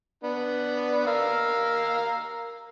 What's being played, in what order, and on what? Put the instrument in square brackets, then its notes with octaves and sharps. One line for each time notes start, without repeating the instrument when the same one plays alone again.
[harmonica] B3 D4
A#4 F5 E6